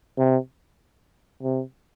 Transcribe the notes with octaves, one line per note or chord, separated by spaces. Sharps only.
C3
C3